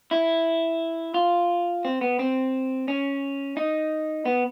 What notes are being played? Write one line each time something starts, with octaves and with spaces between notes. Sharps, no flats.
E4
F4
C4
B3
C4
C#4
D#4
B3